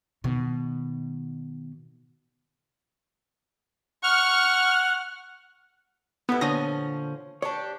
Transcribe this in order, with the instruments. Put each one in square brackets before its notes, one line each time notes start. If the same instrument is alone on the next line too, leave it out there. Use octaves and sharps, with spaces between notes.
[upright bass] B2 D#3
[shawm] F#5 [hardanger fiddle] C#6 [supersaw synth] F6
[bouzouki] A2 G3 E4 [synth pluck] B3
[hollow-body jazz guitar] A#2 D3 [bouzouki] F3 C#4 [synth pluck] D#6 A#6
[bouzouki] D4 G4 [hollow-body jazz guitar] C#5